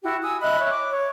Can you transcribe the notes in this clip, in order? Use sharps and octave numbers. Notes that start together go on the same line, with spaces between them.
E4 F#4 G4
G#5 D#6 E6
D#5 E5 B5 F#6
C#5 E5
D6
C#5